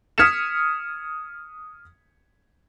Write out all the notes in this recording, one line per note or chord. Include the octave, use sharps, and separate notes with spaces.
D#6 F6 G#6 B6 C#7 E7